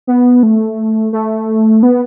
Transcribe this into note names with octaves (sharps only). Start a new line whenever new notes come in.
B3
A3
A3
B3